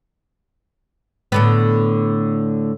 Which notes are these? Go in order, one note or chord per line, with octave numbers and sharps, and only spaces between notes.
A2 D3 B3